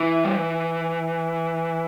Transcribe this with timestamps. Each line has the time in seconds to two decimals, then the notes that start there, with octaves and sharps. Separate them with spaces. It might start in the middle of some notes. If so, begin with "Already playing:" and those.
Already playing: E3
0.25 G3
0.36 E3